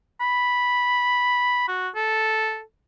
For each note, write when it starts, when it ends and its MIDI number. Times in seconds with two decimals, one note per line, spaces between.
0.21 1.66 83
1.68 1.89 66
1.95 2.61 69